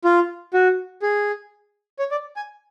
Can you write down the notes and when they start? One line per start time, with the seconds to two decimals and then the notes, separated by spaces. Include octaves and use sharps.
0.04 F4
0.54 F#4
1.02 G#4
1.99 C#5
2.11 D5
2.36 G#5